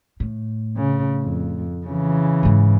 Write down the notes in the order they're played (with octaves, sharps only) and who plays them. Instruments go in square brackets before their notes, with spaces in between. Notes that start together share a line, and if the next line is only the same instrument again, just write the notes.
[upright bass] A2
[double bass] C#3
F2
C#3 E3
[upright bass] G#2 D#3